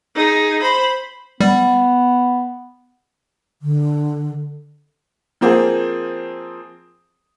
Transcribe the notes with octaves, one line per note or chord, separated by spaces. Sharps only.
D#4 G#4
C5 B5
G3 B3
D3
F3 A#3 C4 G#4